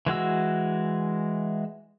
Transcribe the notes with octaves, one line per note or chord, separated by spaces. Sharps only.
E3 G#3 F#4 E6